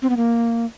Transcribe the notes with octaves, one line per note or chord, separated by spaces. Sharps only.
C4
B3
A#3